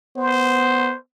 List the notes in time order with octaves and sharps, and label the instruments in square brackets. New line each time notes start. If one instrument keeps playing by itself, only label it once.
[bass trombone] B3 [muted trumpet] C5